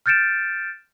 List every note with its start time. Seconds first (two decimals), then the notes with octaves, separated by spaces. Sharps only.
0.06 F6 G6 A6 C#7 D7 E7